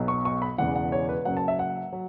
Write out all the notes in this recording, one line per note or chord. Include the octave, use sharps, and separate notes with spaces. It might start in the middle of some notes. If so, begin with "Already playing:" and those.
Already playing: B1 B2 F#3
C#6
C#6
B5
E1 E2 C#3 E3 F#5
F#5
C#5
B4
F#1 F#2 F#3 F#5
A5
E5
F#5
F#3